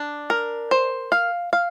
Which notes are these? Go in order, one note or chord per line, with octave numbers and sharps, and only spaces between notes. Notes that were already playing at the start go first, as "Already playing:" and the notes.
Already playing: D4
A#4
C5
F5
F5